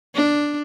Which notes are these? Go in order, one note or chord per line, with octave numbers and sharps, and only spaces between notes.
D4